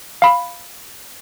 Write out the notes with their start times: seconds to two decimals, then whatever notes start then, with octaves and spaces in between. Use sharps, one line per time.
0.22 F5 B5